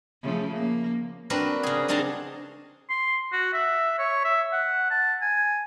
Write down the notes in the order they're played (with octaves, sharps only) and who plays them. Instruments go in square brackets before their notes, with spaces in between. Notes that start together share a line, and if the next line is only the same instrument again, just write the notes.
[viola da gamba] C#3 F3 A3
A#3
[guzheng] C4 D4 F#4 A#4 B4
C#3 G#4
C4 D4 D#4 G#4 A5 A#5
[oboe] C6
F#4
E5
C#5
E5
F#5
A5
G#5